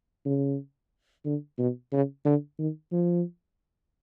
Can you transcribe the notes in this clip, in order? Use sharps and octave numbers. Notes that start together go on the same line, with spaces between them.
C#3
D3
B2
C#3
D3
D#3
F3